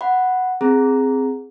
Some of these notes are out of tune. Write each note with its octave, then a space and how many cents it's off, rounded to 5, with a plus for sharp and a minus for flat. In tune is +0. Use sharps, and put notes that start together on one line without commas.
F#5 +0 B5 +0
C4 +0 G#4 +0 A#5 +0